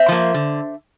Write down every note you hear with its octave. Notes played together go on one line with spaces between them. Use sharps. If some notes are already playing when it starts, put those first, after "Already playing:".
Already playing: C5 E5
F3 A#3
D3